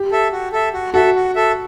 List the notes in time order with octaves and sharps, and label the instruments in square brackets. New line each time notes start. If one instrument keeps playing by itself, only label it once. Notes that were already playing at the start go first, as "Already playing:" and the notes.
Already playing: [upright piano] G4
[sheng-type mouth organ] A4 E5
F#4
A4 E5
F#4
[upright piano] F#4 [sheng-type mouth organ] A4 E5
[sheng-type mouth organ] F#4
A4 E5